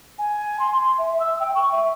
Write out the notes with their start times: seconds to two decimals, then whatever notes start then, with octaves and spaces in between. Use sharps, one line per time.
0.19 G#5
0.59 C6
0.98 E5
1.20 E6
1.40 G5
1.55 C#6
1.72 E5